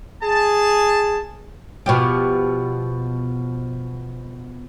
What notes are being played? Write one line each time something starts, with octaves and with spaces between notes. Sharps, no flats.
G#4 A5
B2 F3 G4